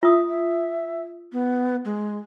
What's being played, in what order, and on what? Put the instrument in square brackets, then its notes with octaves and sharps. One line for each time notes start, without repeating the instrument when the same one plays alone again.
[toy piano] F4 D#6 [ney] E5
[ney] E5
B3
G#3